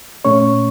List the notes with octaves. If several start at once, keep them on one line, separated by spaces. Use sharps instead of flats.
A#2 A3 C#4 C#5 C#6